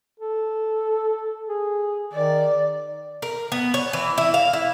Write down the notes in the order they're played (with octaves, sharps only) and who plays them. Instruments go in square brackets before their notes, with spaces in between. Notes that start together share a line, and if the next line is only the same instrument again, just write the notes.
[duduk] A4
G#4
[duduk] D#3 [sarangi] D5
[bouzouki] A#4
B3
C#5
E3
E4
F5
E4